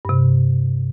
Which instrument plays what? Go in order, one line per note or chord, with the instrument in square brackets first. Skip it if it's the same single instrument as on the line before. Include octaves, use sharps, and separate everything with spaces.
[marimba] G2 C3